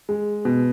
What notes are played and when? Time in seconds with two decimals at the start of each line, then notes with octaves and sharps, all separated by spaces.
0.09 G#3
0.45 B2